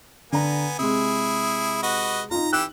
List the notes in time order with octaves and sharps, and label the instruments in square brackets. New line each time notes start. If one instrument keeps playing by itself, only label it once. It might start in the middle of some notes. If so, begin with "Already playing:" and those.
[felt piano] D3 A#5 [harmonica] B3 G#5
[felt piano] C3 G#3 [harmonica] E4 G#4
[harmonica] F#4 B4 D#5
[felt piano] D#4 F4 [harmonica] A#5
[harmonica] E3 G4 E6 [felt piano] F#6